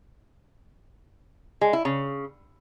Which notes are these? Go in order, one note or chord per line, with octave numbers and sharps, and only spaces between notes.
G#3
E4
C#3